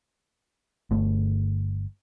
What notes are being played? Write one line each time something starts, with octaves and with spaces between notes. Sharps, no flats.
G1 A3